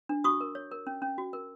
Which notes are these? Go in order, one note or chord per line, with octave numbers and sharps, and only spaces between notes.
D4
F#4 C#6 D#6
A#4
C#5
A#4
C#4
C#4
F#4
A#4